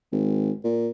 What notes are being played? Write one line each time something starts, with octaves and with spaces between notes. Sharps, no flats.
G#1
A#2